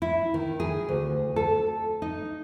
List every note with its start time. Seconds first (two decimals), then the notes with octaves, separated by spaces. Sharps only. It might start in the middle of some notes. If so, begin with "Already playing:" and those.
0.02 E4
0.34 D#3
0.60 G#4
0.89 D2
1.36 A4
2.02 D#4